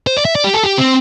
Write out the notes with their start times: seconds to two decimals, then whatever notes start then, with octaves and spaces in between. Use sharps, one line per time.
0.07 C5
0.17 D5
0.25 E5
0.35 D5
0.44 G4
0.54 A4
0.64 G4
0.78 C4